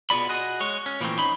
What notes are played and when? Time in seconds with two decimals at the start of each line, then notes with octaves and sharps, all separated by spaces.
0.10 B2 B3 F4 G#4 D5 B5
0.29 F#4 G#4 D#5
0.60 G#3 C#5
0.86 C#4
1.01 A#2 E3 F3 G#3 A3 C4
1.18 C#4 D#4 B5